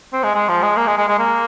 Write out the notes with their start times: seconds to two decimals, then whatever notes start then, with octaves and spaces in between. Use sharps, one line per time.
0.13 C4
0.23 G#3
0.35 G#3
0.49 F3
0.63 G#3
0.77 A#3
0.87 G#3
0.98 G#3
1.08 G#3
1.19 A#3